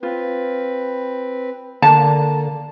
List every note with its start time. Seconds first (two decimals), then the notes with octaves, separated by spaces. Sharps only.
0.03 C4 F4 B4
1.82 D3 A#3 A5